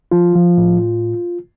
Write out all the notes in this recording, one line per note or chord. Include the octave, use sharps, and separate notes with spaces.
F3 F4
F3
A2